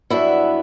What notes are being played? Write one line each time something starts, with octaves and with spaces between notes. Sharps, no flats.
G2 F#3 B3 D4 E4 E5